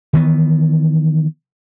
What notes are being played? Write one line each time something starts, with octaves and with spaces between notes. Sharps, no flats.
D#3 E3 B3